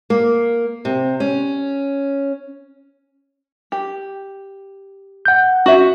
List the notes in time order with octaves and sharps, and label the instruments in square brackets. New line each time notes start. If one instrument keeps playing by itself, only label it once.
[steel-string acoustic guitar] A#3
C3
C#4
[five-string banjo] G4
[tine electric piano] F#5 G6
[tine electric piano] C#4 [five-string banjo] F#4 E5